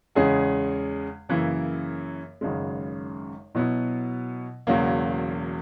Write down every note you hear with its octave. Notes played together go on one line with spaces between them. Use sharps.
E2 C#3 G#3 C#4 G#4
F#2 C#3 E3 A#3 E4
G#1 F#2 C#3 G#3
B2 F#3 B3 E4
E1 E2 C#3 F#3 A#3